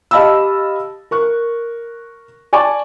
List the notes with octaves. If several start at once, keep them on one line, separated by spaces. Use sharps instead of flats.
G4 D#5 F5 A5 B5 E6
A#4 C#6 F#6
D5 G#5 A5 C#6 D6